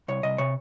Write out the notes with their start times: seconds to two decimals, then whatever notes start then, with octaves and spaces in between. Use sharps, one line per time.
0.08 C2 C#5
0.23 C2 D#5
0.38 C3 C#5